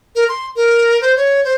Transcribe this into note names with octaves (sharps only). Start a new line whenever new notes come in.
A#4
C6
A#4
C5
C#5
C5